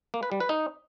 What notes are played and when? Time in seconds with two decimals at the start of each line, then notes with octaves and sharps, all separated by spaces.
0.14 A#3
0.23 B4
0.32 G3
0.40 B4
0.49 D#4